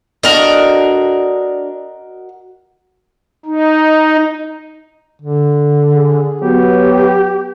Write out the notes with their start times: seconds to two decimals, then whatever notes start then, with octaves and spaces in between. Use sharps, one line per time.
0.23 D4 F#4 A4 A#4 D#5
3.46 D#4
5.22 D3
5.95 G#4
6.41 F#3 B3 G4